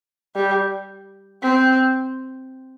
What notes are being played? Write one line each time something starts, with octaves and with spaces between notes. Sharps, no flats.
G3
C4